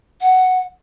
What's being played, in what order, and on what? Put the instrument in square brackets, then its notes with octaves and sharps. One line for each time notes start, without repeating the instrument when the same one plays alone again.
[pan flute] F#5